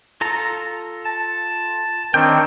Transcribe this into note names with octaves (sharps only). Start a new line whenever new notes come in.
F4 A4 A#5
A5
D#3 C4 D4 C#5 G5